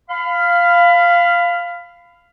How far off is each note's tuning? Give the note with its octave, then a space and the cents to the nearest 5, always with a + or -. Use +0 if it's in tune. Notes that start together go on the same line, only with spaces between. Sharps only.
F5 -5 B5 +25